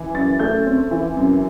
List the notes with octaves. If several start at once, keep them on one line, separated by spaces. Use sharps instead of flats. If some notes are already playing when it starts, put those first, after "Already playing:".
Already playing: E3
F#2 A6
A3 G6
C4
E3
F#2